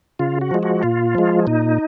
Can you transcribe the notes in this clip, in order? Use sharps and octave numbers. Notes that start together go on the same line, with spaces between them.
C#3 F4
F#4
F3 G#3
F#4
A#2 F4
F3 G#3
A#2 D#4